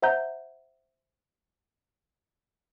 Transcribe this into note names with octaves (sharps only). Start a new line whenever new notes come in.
C5 E5 F#5 A#5 G6